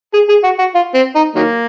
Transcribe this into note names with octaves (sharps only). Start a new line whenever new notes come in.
G#4
G#4
F#4
F#4
F4
C4
D#4
D#3 F#3 A#3